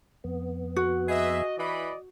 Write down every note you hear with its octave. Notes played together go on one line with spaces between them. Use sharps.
F2 B3
F#4
G#4 B4 D#5 E5
E3 D5 D#5 B5